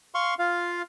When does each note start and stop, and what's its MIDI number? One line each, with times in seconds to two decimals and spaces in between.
0.14 0.34 77
0.14 0.34 84
0.14 0.34 85
0.39 0.82 65
0.39 0.82 77